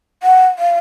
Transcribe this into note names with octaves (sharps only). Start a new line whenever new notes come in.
F#5
F5